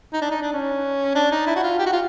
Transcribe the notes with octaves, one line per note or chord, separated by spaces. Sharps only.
D#4
D4
D#4
D4
C#4
D4
D#4
E4
F#4
F4
G4
F#4
F4